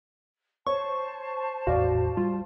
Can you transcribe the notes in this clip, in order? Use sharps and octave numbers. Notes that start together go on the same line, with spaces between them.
C5 C#5 A5 C#6
G#1 E2 A2 F#4 D5 F5
G3 F4